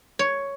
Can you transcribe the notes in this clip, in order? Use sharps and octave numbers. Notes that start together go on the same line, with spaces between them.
C#5